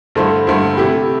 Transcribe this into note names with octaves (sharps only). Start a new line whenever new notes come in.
G2 D3 A3 E4 C5
G2 D3 A3 E4 C5
C3 A3 E4 G4